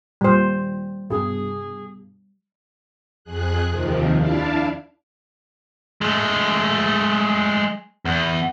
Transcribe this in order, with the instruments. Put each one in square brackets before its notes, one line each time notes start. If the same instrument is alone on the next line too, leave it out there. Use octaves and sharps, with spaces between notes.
[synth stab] D#2 A#2 [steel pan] G3 C5
[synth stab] C2 G2 B2 [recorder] G#4
[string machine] F2 G#4 F#6
D#2 C3 D#3 F3
D4 E4 D5 F5 A5
[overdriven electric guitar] G#3 A3
E2